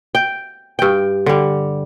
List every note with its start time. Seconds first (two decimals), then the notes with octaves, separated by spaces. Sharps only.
0.15 G5
0.79 G2 G5
1.26 D3 G3